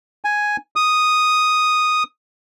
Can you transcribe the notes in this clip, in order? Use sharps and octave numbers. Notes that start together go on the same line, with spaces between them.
G#5
D#6